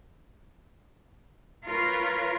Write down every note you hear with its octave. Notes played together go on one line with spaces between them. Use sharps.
F4 A#4 B4 C#5